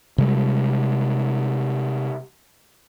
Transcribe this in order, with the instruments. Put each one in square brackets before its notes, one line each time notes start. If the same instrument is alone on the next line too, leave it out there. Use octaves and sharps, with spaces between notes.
[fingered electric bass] C3 G3 G#3